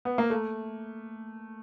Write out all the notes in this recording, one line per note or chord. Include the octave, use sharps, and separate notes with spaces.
B3
A#3
A3